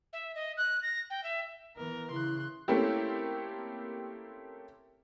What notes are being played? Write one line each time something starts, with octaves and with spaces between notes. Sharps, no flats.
E5
D#5
F#6
A#6
G5
E5
E3 B3 A#4
C#3 E3 E4 C6 F#6
A3 A#3 C4 C#4 E4 G4